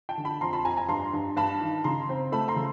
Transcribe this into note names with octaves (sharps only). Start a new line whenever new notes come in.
G5 A5
D3
A5 B5
F2 A#5 C6
A5 B5
F2 G#5 A#5
G#5 A#5
G2 A#5 C6
G2
G2 A5 B5
D#3
C#3 A#5 C6
C4
A3 A5 B5
A#5 C6
C#3